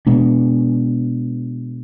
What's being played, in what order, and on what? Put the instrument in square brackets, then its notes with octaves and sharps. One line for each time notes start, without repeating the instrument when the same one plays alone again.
[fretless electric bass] B2 G#3 B3 D4